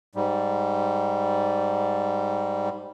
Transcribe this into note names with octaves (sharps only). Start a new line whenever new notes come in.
G#2 G3